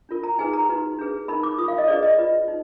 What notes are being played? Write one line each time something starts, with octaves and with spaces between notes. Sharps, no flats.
D4 F4 A#4
A#5
D#4 G#4 B4 G#5
A#5
D#4 F#4 B4
D4 G#4 B4
D#4 A#4 B5
D6
F4 A#4 D#6
F5
D#5
D4 G#4 B4 D5
D#5
F4 B4
D#4